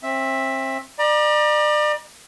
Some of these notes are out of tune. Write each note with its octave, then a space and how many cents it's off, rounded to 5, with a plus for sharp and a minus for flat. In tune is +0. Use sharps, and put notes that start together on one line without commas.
C4 +30 E5 +0
D5 +35 A#5 +40